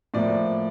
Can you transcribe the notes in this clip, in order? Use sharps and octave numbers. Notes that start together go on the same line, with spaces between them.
A2 F3 A#3 D5